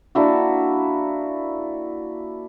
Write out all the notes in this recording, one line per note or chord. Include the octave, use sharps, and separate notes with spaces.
A#3 D4 E4 F#4